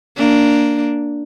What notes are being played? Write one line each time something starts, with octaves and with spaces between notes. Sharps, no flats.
A#3 D4